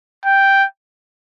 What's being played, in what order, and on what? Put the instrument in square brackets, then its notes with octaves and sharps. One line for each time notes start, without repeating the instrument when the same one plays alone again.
[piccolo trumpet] G5